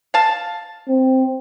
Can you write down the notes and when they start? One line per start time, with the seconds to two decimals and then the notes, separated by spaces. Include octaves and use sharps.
0.14 F5 A5
0.88 C4